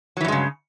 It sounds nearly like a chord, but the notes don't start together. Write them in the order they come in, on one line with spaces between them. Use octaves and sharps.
F#3 E3 G2 G#3 C#3